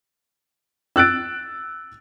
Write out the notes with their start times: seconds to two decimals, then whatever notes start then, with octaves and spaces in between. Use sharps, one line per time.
0.96 E6 F#6 A6 D7